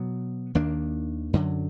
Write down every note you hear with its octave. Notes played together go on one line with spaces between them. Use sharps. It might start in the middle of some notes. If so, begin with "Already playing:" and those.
Already playing: B2 F#3 B3
D#2 D#3 A#3 D4
F#2 D3 F#3